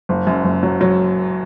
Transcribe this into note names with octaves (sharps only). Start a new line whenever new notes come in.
F#1
F#2
F#1
F#3
F#3